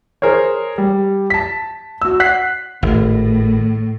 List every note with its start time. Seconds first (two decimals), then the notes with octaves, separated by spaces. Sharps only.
0.22 G#4 A#4 C5 C#5
0.78 G3
1.30 A5 B6
2.02 F#4 E6
2.20 F#5 F#6 B6 C7
2.83 G#1 A2